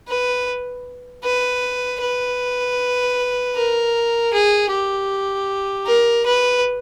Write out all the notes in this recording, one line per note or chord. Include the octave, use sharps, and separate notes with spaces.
B4
B4
B4
A#4
G#4
G4
A#4
B4